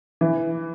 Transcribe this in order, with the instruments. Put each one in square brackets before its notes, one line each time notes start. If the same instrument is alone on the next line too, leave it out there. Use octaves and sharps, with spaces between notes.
[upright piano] E3